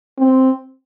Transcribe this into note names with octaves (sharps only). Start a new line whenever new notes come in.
C4